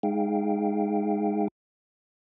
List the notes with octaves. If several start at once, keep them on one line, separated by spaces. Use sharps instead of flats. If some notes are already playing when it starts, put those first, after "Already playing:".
G#3 D#4 G#4 F5 G5